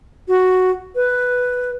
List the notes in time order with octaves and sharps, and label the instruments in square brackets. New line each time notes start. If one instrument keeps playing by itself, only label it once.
[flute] F#4
B4